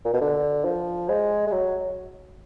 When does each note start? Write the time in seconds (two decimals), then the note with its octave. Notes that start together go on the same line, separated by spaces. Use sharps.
0.05 A#2
0.14 B2
0.21 D3
0.65 F3
1.09 G#3
1.47 G#3
1.52 F#3